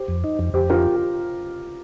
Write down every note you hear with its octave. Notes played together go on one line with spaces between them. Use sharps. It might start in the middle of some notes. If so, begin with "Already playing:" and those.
Already playing: G4 C5
F2
D#4
F2
F2 G4 C5
F4 G4 A#4